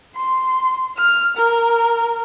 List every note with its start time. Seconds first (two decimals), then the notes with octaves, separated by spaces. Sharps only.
0.15 C6
0.97 F6
1.37 A#4